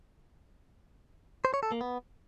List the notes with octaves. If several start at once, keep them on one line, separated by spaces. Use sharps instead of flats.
C5
C#5
A4
A#3
B3